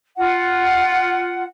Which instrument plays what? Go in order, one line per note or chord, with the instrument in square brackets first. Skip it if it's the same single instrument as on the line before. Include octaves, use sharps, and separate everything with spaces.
[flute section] F4 F#5